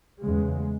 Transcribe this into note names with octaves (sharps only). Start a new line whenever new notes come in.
E2 C#3 G#3